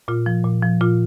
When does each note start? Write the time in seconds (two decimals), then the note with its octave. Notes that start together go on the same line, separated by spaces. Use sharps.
0.08 A#2 F4
0.26 F3
0.44 A#2
0.63 F3
0.81 A#2 F4